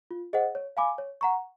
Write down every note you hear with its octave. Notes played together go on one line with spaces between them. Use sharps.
F4
G#4 C5 D#5 F#5
C#5
F5 G#5 B5 D6
C#5
F#5 A#5 C#6